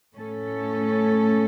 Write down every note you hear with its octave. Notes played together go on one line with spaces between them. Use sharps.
A2 A3 C#4 A4